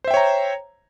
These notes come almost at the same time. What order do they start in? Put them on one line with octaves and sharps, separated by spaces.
C5 E5 G5 C#5 A#5